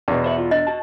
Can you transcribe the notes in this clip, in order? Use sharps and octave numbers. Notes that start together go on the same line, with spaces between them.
E2 B2
C5 E5 F#5
F4
D4 D#5
F#4 A5